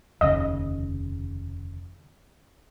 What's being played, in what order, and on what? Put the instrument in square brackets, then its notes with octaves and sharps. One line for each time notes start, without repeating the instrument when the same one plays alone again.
[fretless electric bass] F1 D#2 C#3 [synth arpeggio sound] D#5